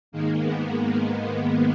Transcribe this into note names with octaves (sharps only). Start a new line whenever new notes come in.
G#2 D#3 G#3 A#3
B3